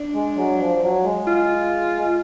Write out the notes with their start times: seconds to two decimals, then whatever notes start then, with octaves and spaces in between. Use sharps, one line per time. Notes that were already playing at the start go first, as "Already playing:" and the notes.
Already playing: D4
0.14 G#3
0.36 F#3
0.59 F3
0.77 F3
0.82 F#3
1.04 G#3
1.27 F4